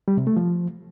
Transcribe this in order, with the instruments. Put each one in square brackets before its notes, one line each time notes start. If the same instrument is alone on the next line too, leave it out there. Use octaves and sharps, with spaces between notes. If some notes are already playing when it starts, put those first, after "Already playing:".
[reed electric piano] G3
C3
A3
F3